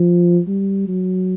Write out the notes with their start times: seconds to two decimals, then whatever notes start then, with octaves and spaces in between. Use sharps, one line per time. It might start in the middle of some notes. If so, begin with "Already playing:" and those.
Already playing: F3
0.48 G3
0.88 F#3